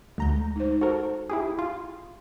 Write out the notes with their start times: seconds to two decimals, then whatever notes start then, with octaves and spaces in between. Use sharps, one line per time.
0.18 D2 G#3 A#5 G6
0.56 D#4 C5
0.81 F#4 A4 A#4 C5
1.30 E4 G4 G#4
1.59 F4